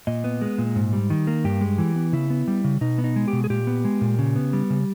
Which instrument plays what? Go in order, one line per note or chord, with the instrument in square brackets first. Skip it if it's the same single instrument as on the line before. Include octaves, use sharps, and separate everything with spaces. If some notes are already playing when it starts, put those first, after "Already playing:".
[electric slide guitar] A#2 D#5
B3
G#3
A#2
G#2
G3
D#3
A#3
G2 G4
G#3
E3
B3
C#3 E4
B3
G3
C#3
B2 D#4
B3
D#4
G#3
G4
B2
G#4
A#2 G4
B3
G#3
A#2
C#3
B3
G3
C#3